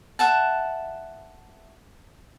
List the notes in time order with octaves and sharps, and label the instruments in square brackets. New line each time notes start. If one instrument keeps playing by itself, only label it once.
[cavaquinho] E5 F#5 A5